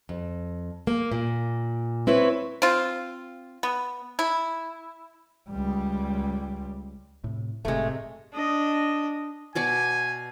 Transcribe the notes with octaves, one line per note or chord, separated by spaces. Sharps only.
F2
A#3
A#2
C4 E4 B4 C#5
C4 F4
B3
E4
C#2 G3
A2 C3
F#1 A2 C3 G#3 A3
D4 D#5
B2 D5 G#5 C#6